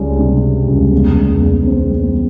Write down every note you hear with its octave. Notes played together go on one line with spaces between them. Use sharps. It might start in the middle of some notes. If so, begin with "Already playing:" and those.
Already playing: C#2 G3 C#4
C3
G3
C#2
E2
E2
E2
C4
E2